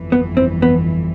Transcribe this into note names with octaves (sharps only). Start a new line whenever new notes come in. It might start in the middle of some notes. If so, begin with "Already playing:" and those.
Already playing: G1 F2 E3
B3
C4
B3